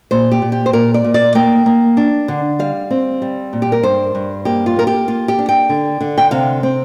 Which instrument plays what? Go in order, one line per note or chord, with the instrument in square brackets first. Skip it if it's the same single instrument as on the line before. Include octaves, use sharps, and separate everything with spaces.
[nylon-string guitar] A#2 C5
G4
A#2
G4
C5
A#2 A#4
D5
A#2
D5
A#3 G5
A#3
D4
D3
G3 F5
C4
G3
A#2
G4
A#4
G2 C5
G2
A#3 G4
F4
A#3 A#4
G4
A#3 F4
G4
D4
G5
D3
D3
G5
C3 F5
C4